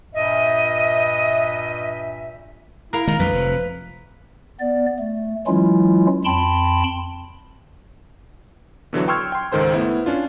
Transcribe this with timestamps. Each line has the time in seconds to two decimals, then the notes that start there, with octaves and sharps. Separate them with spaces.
0.13 G2 A#2 D#5 E5
2.93 E4 A#4 F5
3.08 D#3 G#3 A#5
3.19 A#1 F2 G#3 B4
3.33 F1 F3
4.60 B3 D5
4.99 A3
5.47 E3 F#3 G#3 C#4 E4 F4
6.25 F2 G5 A5 B5 C6
8.93 B2 D3 E3 F#3
9.08 G5 C6 C#6 E6 F6 G#6
9.32 G5 C6
9.52 C#2 G#2 D#3 A4 C5 C6
9.73 A3 B3 E4
10.06 C#4 D4 F4